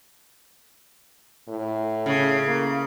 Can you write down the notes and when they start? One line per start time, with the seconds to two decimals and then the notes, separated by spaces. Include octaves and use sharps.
1.48 A2
2.06 C#3
2.47 A#3